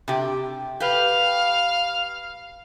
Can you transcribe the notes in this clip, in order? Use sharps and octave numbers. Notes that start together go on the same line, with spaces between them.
C3 G4
G4 B4 F5